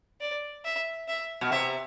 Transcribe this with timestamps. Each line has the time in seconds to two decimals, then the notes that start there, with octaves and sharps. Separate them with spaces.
0.20 D5
0.65 E5
1.08 E5
1.41 B2
1.52 C3 E5